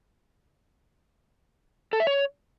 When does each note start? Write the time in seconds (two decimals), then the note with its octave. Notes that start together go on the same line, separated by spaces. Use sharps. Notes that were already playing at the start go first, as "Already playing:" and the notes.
1.93 A4
2.00 E5
2.07 C#5